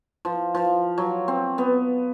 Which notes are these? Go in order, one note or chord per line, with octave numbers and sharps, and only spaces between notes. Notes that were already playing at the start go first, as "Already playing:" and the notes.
F3
F3
F#3
C4
B3